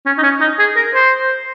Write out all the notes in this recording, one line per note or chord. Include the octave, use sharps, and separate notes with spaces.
C#4
D#4
C#4
D#4
G#4
A#4
C5